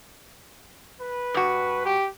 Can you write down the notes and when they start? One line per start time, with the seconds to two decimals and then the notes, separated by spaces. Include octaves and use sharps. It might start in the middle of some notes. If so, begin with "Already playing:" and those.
1.00 B4
1.34 G2 F#4
1.85 G4